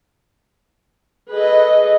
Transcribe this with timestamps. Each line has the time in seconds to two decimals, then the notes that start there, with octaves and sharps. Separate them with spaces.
1.31 G#4 A4 B4 D#5